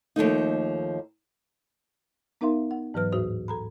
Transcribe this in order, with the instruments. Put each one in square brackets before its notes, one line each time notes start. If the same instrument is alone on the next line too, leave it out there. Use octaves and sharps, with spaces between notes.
[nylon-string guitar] D#2 F3 A3 D#4
[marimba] B3 D#4 A#4 E5 F5 C6
F#5
G#2 E3 F#3 B4 F6
D#2 A2 F#4 C5 D#6
A4 A#5 B5